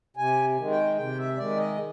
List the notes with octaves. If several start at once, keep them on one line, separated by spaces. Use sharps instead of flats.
C3 G#5
D#3 G#3
G5
C3 G5
E5
D#3 G#3 D5
D#5